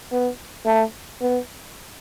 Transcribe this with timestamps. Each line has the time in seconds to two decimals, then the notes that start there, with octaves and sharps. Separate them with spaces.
0.12 B3
0.66 A3
1.21 B3